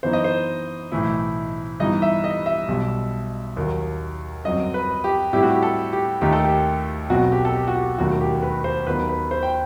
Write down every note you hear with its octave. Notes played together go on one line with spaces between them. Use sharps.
F#2 E3 B3 D#4 C5
D#5
C5
B1 A2 E3 A3 E4
G2 E3 B3 D#4 D#5
E5
D#5
E5
B1 B2 G3
D#2 D#3 F#3
G1 F#2 F#3 C4 D#5
B4
G4
A2 G3 C4 E4 G4
F#4
G4
A4
G4
D#2 D#3 A3 D#4 G4
A4
G4
B1 B2 F#3 C4 F#4
G4
A4
G4
F#4
G4
E1 D#2 D#3 F#3 A3 F#4
G4
B4
C5
D#2 D#3 F#3 B3 D#4 B4
B4
C5
G5